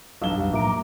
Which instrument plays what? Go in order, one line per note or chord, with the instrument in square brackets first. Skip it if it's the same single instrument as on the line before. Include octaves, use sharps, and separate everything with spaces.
[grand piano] B1 G2 G7 [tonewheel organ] F3 D#5 E6 [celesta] F5
[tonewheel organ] F2 G3
[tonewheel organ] A2 F3 A#3 [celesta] E5 D7 [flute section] A#5 D6